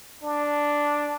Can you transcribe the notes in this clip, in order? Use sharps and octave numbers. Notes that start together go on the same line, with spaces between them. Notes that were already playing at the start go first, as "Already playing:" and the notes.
D4